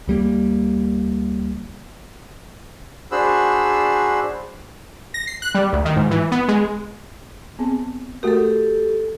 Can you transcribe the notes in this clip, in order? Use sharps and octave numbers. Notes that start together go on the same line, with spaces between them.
D2 G3 A#3
D4 F#4 G#4 C5 B5 E6
A#6
C7
F#6
G3
D2
D#3
G#2
E3
B3
G#3
B3 C4 G#4
A3 F#4 G4 A4 A#4